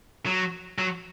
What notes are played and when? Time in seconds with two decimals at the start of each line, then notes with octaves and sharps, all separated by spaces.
0.26 F#3
0.78 F#3